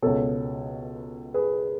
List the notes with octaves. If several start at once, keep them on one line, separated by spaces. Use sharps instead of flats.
C#2 B2 A4 C#5
G#4 B4